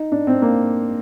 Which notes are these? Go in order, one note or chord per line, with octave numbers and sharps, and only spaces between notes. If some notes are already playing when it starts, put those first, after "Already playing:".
Already playing: D#4
D4
C4
A#3